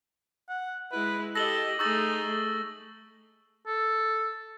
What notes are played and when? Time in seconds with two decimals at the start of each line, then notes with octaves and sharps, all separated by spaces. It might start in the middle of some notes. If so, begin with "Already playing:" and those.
0.49 F#5
0.92 G#3 E4 B4
1.35 G4 A4 D#5 A#6 F#7 G7
1.79 A3 D#4 G#4 C#6 E6 A6
2.26 A3
3.67 A4